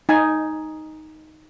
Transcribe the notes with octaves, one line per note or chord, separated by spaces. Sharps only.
D#4 G#5